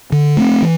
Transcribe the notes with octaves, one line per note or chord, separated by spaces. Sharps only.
D3
A3 C4
E3